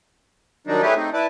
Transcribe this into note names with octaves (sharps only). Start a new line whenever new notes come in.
D#3 F#3 G3 D4 D#4
A3 C#4 E4 G4 G#4 B4
A3 C4 D#4
E4 B4 D5 A5